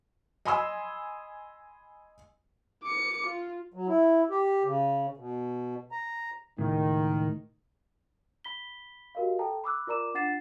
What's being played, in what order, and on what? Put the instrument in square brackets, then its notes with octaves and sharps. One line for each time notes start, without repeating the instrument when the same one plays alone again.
[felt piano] D#5 G#5 B5 C6 D#6 E6
[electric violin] D6 C#7
F4
[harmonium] F#3
E4
G4
C#3
B2
A#5
[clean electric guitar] C#2 A2 [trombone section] D#3
[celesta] B5 B6 G7
F#4 G4 A#4 D#5 F5
A4 G5 A5 A#5
B5 D6 E6 F#6
F4 A#4 D5 A#5 D6 E7
D4 F4 F#5 A6 C7 E7